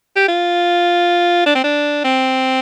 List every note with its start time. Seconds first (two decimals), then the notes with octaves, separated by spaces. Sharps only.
0.16 G4
0.28 F4
1.46 D4
1.55 C4
1.64 D4
2.04 C4